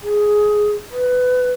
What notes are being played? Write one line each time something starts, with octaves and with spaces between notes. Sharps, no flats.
G#4
B4